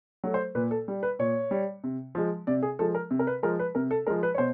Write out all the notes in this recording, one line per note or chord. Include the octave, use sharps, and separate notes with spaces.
F#3 A3
C5
A#2 B4
A4
G3
B4
A#2 C#5
G3
C3
F3 G#3
C3 D5
G#4
F3 G#3 A4
A#4
C3
A#4
B4
F3 G#3 A#4
B4
C3 A#4
A4
F3 G#3 A#4
B4
C#5
B2 C5